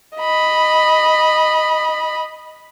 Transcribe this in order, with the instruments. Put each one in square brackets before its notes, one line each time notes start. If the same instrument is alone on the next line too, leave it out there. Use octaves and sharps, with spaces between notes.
[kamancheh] D#5 B5